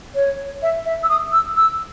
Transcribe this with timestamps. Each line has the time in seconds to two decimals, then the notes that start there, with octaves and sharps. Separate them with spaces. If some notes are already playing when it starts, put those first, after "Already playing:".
0.15 C#5
0.62 E5
0.85 E5
1.03 E6
1.09 D#6
1.32 E6
1.56 E6